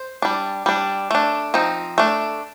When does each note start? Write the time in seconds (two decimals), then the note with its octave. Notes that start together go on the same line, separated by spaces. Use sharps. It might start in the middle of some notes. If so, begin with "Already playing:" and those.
Already playing: C5
0.22 G3 D4
0.66 G3 D4
1.11 A3 D4
1.54 F3 C4 D#4
1.98 A3 D4